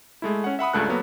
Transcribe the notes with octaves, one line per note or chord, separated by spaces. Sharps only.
G#3 A3 E4
C#4 F#5
E5 F#5 B5 D#6
C#2 G2 A3 A4 F#6
F#3 A#3 B3 A4